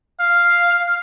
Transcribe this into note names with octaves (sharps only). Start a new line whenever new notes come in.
F5